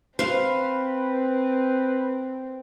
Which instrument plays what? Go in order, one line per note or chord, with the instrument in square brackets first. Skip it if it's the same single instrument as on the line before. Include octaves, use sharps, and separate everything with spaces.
[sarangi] C4 [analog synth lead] B4 [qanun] C5 F5